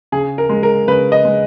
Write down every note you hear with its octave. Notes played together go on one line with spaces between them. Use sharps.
C#3 G#4
A#4
G#3
A#4
C#3 B4
D#5
G#3